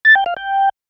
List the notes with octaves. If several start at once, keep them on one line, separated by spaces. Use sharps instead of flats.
A6
G5
F5
G5